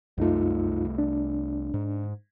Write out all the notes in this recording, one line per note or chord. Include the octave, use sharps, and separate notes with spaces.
C2 F#2 A3 D#4 F4
D4
G#2